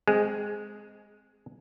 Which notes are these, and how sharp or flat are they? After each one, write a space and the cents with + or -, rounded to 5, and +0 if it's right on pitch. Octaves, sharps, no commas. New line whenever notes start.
G#3 +0 C4 -10 G#4 +0